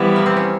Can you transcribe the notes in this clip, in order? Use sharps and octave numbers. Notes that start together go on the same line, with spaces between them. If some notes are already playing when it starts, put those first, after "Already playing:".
Already playing: E3 F3 G3 B3 E4
A#3
C4
C#4